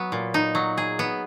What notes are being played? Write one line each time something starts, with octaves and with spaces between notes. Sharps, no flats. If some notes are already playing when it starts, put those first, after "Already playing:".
Already playing: F#3 B3
A#2
D#4
F#3
G#4
B3